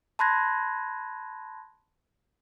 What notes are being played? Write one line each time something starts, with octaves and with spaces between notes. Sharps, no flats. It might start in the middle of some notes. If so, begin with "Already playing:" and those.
A5 B5 C6 F#6 G#6 A#6